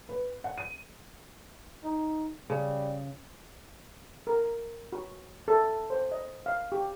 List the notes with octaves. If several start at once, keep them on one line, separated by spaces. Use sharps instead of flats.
B4
F#5
D#7
D#4
C#3 G3
A#4
F#4
A4
C5
D#5
F5
G4